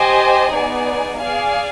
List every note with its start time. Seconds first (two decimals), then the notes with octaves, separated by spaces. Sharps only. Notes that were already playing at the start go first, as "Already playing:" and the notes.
Already playing: G4 C5 D#5 G#5
0.52 B3 D#4 G#4 D5 G#5
1.21 G#4 D5 F5 G#5